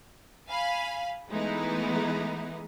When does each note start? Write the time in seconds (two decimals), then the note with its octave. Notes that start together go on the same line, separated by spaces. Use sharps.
0.48 F5 G#5 B5
1.29 E3 G#3 A3 B3 D#4 E4